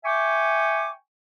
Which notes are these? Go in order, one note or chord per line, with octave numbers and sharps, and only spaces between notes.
E5 G5 G#5 C#6 D6